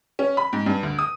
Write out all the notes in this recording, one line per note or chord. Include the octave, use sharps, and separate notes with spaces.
C#4
B5
G#2
G2
D2
D#6